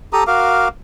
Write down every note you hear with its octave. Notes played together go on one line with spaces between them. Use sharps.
G4 A4 A#5 D#6
F#4 A#4 F5 D6